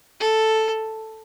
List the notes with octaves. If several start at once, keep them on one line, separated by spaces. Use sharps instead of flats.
A4